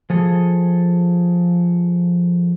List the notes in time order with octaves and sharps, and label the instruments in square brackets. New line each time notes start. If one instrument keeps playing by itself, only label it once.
[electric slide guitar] F3 G#4 A4